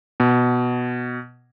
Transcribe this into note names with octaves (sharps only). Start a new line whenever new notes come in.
B2